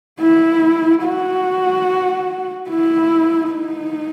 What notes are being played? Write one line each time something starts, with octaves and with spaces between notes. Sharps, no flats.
E4
F#4
E4
D#4